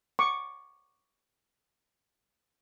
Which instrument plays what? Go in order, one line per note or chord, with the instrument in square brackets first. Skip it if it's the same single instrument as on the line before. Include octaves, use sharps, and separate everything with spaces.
[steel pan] C#6 D6